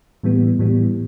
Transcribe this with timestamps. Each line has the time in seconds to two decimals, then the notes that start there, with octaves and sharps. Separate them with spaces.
0.23 A2 E3 G3 B3
0.59 A2 E3 G3 B3